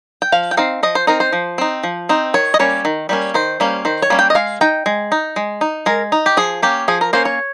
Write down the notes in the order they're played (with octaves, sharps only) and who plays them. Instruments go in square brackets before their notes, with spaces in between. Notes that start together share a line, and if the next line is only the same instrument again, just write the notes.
[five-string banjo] G5
F3 F5
G5
C4 D#4 F5
F3 D#5
C5
C4 D#4 A#4
C5
F3
C4 D#4
F3
C4 D#4
D#3 C#5
D#5
G3 A#3 C#4 C#5
D#3
G3 A#3 C#4
D#3 C5
G3 A#3 C#4
D#3 C5
C#5
G3 A#3 C#4
G5
D#5
G#3 F5
D#4 G5
G#3
D#4
G#3
D#4
G#3 A#4
D#4
G4
F3 G#4
A#3 C#4 G4
F3 G#4
A#4
A#3 C#4 C5
C#5